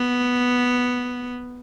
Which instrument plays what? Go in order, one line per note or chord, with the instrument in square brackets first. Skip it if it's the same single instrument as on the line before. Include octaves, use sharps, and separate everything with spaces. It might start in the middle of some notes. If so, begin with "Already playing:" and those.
Already playing: [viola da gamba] B3